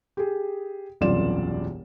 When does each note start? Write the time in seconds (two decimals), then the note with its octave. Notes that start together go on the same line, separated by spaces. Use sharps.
0.17 G4 G#4
1.01 E1 C2 F#2 F4 D5 E7